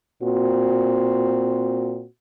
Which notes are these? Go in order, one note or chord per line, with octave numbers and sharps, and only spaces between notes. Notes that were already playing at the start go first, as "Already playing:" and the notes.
A#2 C4 F#4